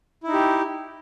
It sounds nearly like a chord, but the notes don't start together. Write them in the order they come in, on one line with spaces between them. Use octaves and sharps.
E4 D#4 G4